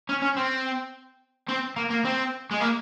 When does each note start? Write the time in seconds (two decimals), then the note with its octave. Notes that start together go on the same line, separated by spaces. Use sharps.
0.09 C#4
0.22 C#4
0.37 C4
1.48 C4
1.76 A#3
1.91 A#3
2.05 C4
2.51 G#3
2.61 A#3